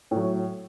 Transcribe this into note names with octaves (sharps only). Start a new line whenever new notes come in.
A2 F#3